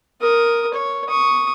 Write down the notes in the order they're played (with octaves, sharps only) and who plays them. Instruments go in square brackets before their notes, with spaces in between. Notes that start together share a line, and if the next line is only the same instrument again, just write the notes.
[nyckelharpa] A#4 D#6
C#5
C#6 D#6